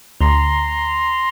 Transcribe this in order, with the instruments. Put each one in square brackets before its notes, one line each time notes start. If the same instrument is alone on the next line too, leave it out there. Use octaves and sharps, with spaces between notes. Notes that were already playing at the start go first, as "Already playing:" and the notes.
[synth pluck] D2 [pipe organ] A#5 C6